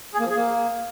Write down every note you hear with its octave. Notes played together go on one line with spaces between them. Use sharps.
G#4
A#3
F3
G#4
A#3